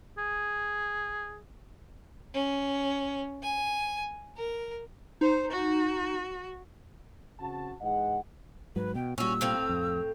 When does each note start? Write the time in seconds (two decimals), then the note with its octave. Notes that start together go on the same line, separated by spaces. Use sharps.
0.18 G#4
2.34 C#4
3.42 G#5
4.37 A#4
5.21 D#4 C5
5.51 F#4
7.39 C#3 C4 F#4 A5
7.81 G#2 E3 G#3 D#5 F#5
8.76 G#2 F#3 B4
8.95 B2 G5
9.18 A#2 G3 C#4 F#4 E6
9.41 A2 C4 F5
9.69 F2